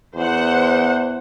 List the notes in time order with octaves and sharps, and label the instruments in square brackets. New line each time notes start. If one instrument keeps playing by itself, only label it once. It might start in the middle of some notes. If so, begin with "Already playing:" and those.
[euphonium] E2 [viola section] C5 F#5